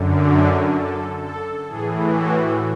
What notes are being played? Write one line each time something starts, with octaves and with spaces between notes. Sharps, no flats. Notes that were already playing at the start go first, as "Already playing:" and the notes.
Already playing: F#2 D3
D5
A4
A4
A2 E3 G#4
F#4